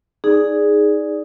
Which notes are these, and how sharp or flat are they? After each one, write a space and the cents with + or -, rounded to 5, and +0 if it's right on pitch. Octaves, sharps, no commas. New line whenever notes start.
D#4 +5 G#4 +0 D5 +0